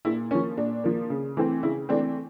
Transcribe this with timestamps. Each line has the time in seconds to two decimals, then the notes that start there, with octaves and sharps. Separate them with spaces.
0.05 A#2 E4
0.31 F3 A#3 C#4
0.58 A#2 D4
0.84 F3 A#3
1.10 C#3
1.37 E3 A3 C4
1.63 C#3 E4
1.89 E3 A3 C4 D4